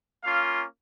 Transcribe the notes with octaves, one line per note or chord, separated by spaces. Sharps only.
A#3 C#4 F4 F5